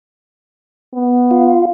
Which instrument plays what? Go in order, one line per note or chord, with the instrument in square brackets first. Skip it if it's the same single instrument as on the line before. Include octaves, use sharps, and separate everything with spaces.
[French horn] B3
[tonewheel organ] F4